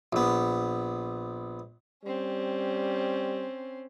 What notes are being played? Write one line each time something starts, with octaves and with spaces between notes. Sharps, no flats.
A#1 B3
G3 C4 C#4